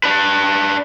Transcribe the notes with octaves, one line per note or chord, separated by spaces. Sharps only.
D4 B4